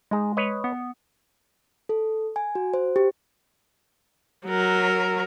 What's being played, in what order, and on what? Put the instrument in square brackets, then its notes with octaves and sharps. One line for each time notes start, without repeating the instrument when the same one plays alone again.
[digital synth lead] G#3 [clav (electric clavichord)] D#4 G#4
[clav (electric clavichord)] B4 C#5 D#5
[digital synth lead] B3
[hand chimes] A4
G#5
F#4
C5
G4
[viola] F#3 A#4